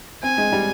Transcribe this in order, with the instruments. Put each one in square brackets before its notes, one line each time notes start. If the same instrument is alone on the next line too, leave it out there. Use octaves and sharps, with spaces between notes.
[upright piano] C4 [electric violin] G#5
[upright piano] G#3
G3